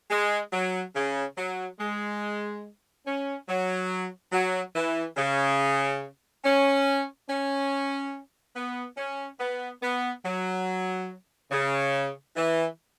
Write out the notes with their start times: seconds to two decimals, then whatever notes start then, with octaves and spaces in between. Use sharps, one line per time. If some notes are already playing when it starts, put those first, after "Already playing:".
0.11 G#3
0.53 F#3
0.96 C#3
1.37 F#3
1.79 G#3
3.06 C#4
3.48 F#3
4.32 F#3
4.75 E3
5.17 C#3
6.45 C#4
7.29 C#4
8.55 B3
8.97 C#4
9.40 B3
9.82 B3
10.24 F#3
11.51 C#3
12.36 E3